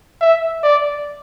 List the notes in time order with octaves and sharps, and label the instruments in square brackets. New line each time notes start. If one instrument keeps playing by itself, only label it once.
[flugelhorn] E5
D5